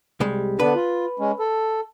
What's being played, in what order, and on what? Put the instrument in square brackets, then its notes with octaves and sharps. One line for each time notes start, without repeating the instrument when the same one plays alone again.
[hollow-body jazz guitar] C2 G3 G#3
[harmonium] D3 B3 D4 [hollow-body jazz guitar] B4
[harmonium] F4
G#3 C#4
A4